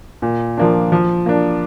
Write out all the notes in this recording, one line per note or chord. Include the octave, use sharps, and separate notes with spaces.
A#2
F3 A#3 D4
F3
A#3 D4